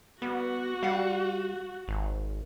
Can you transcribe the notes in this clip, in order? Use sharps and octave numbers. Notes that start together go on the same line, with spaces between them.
G3 B3 F#4
G3 F5 F#5
G#1